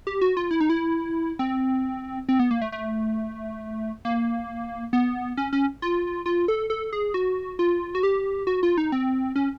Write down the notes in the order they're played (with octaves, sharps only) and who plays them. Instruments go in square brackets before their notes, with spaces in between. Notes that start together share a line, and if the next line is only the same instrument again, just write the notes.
[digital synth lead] G4
F#4
F4
E4
D#4
E4
C4
C4
B3
A#3
A3
A3
A#3
B3
C#4
C#4
F4
F4
A4
A4
G#4
F#4
F4
F#4
G4
F#4
F4
D#4
C4
C#4